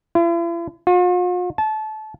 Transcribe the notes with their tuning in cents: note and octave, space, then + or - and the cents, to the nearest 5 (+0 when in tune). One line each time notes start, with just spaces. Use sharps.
E4 +45
F4 +45
A5 -25